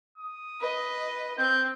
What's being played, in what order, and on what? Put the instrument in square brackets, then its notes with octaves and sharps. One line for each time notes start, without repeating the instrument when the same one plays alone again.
[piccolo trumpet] D#6
[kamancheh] B4 D#5
[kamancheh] C4 [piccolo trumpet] G6